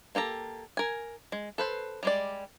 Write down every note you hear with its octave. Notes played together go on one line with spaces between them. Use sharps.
A#3 G4 A4 A#5
A#4 G#5
G#3
A4 B4 C5
G3 G#3 D5